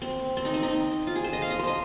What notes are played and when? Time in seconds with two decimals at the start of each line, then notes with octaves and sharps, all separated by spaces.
0.02 C4
0.37 C4
0.45 D#4
0.54 C4
0.63 D#4
1.07 F4
1.16 G#4
1.24 C5
1.33 D#5
1.42 F5
1.50 D#5
1.59 C5
1.67 D#5